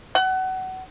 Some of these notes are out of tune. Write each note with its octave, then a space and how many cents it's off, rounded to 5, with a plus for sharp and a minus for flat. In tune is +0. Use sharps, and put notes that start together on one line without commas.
F#5 +25